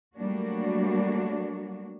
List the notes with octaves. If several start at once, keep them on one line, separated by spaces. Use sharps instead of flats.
F#3 G3 A3 A#3 D4 F#4